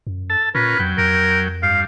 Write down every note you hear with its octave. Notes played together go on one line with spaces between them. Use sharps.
F#2
A4 A5
A#2 C#4 F4 A#4 B4
F2 F#3 G5
F2 A#4
G2 F5